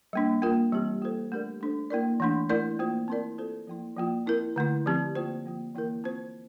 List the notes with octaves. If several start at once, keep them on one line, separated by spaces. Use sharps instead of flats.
G3 A#3 D4
A#3 F4 A#4
E3 G3 C4 G4
A#3 F4 A4 C5
A3 D4 G4 A#4 D5
A3 D4 A4 C5
A#3 E4 A#4 D5
E3 A3 D4
A3 E4 A#4 D5
A#3 F4 C5
C4 E4 A#4 D5
C4 F4 A4 C5
F3 A#3 E4
F3 A#3 F4
C4 E4 A#4
D3 A3 E4
F3 C4 G4
A#3 F4 C5
F3 A#3 F4
E3 A#3 E4 A#4
C4 F4 C5